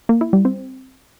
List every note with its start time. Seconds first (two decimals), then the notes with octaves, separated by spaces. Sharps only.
0.09 A#3
0.21 E4
0.33 G3
0.45 C4